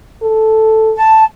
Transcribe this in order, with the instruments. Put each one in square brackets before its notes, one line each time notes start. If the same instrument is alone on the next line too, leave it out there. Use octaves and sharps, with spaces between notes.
[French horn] A4
[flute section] A5